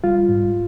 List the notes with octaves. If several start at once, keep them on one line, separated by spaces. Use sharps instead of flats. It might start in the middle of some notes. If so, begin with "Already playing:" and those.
G3 F4
G#2